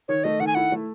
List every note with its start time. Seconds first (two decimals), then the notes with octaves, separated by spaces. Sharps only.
0.08 D#3 C#5
0.24 A3 D#5
0.40 D#3 F#5
0.47 G#5
0.55 E4 F#5
0.72 A3